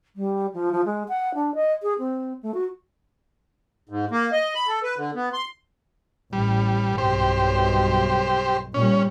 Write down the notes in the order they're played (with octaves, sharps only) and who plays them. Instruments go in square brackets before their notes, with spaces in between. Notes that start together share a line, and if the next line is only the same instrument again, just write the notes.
[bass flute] G3
F3
F3
G#3
F#5
D4
D#5
G#4
C4
A3
F#4
[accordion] G#2
A#3
D#5
B5
A4
B4
D3
B3
C6
[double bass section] A1 [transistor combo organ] G3
[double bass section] B1 G2 [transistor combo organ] G4 C5
[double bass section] A#2 G3 [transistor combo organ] C#4